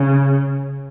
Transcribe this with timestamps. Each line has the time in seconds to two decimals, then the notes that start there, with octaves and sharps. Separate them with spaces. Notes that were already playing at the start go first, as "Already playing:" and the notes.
Already playing: C#3